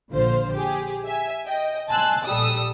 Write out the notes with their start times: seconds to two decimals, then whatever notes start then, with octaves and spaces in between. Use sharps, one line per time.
0.12 A#1 D3 F4 C5
0.54 G4 G#4
1.06 E5 G#5
1.45 D#5 G5
1.89 G#5 A5 C6 E6 F#6 A6
2.25 A#1 G3 A4 D#6 E6